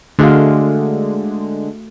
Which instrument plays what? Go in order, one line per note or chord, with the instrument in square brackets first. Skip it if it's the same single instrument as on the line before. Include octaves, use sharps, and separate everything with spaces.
[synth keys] D3 G#3 [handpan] A3 F#4 F5